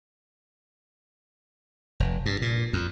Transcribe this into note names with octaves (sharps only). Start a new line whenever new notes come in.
F1
G2
A#2
F2